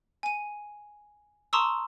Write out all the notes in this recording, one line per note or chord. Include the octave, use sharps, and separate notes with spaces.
G#5 D#7
A5 A#5 C6 C#6 D#6 E6